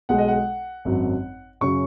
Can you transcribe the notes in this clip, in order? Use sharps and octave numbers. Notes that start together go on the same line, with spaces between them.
B1 B2 G#3 F#5
D#5
F#5
G#1 F#2 F#3
F#2 C#3 F#3 C#6